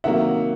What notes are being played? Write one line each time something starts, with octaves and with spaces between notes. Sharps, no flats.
C3 D#3 F#3 A#3 E5 F#5